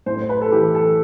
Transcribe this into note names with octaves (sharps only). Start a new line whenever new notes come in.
A2 C5
C5
B4
A4
E3 G4
A4